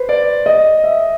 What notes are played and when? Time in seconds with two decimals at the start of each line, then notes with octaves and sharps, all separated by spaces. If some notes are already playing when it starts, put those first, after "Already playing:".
Already playing: B4 C5
0.09 D5
0.46 D#5
0.84 E5